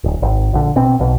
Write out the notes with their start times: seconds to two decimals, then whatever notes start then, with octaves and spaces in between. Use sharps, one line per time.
0.04 D1
0.22 G#1
0.53 A#1 D3
0.76 B2 C4
0.99 B1 B2